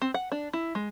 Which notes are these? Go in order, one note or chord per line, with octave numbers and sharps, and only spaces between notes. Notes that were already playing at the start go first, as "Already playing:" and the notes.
C4
F#5
D4
E4
G#3